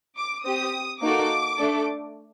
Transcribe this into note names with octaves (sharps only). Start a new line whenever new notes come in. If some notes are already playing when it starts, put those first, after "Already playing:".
D6
C4 G4 D#6
A#3 D#4 F#4 A4 D6
A3 D4 A4